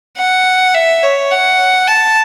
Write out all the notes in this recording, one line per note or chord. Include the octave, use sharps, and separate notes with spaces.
F#5
E5
C#5
F#5
A5